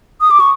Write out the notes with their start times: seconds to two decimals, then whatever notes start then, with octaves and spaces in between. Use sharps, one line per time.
0.21 D#6
0.31 D6
0.40 C#6